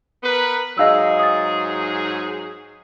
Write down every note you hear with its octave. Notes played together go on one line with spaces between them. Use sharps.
B3 A#4 B4
G#2 F#3 G#4 D#5 F5 E6
D#6 A6